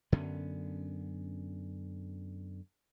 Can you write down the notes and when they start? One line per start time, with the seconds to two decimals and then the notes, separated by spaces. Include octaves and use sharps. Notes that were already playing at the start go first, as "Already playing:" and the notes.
0.12 F#2 D3 B3 C#4